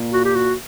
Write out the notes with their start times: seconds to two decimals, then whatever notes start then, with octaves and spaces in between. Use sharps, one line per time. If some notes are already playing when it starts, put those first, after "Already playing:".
Already playing: A#2
0.13 F#4
0.25 G4
0.35 F#4